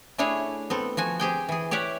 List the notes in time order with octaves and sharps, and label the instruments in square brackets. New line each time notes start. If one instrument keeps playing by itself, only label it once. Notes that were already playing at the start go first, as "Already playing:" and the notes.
[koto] A3 D4 E4 G#4 C#5
B3 C4 A4
F3 F#4 G#5
C4 G4 G#4 G5
E3 G#4
G4 C#5 D5 E5 F#5